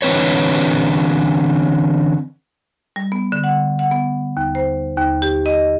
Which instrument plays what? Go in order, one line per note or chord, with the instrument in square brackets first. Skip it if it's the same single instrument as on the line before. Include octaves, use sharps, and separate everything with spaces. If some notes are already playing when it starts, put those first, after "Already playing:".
[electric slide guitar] D3 E3 C4 B4 C#5
[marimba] G3
B3
D3
F#5
F#5
B3
D#2
C5
D#2
G4
D#5